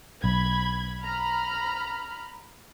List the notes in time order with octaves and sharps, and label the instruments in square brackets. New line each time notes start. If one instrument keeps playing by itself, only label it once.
[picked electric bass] B1 [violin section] B5 G#6
[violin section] A#5 B5 F6